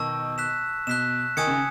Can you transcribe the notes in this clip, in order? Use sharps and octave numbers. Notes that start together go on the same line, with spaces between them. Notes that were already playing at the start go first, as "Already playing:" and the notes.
Already playing: B2 D#3 A5 C#6 E6
F#6 B6 E7
B2 F#6 B6 E7
D#3 G#5 D#6 G#6 C#7
C#3